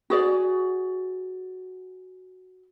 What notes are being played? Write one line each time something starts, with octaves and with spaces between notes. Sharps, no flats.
F#4 G#4 D5